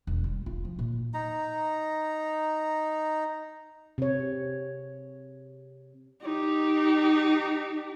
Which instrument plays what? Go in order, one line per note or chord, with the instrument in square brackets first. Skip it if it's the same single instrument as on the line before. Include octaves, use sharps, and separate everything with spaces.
[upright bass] E1
G3
F4
F3
A#2
[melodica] D#4 A#5
[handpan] C3 C#5
[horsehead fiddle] D#4 G4